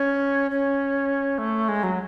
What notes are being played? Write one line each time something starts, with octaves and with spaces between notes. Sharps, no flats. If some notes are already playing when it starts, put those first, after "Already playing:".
Already playing: C#4
C#4
A3
G#3
F#3